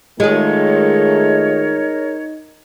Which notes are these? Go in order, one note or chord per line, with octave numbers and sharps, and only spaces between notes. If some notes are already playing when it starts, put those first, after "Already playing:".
D#3 G#3 A3 D#4 F4 G#4 A#4 C#5